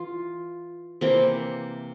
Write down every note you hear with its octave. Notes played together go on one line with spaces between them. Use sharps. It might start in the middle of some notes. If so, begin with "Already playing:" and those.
Already playing: E3 F4
C3 E3 A#3 C4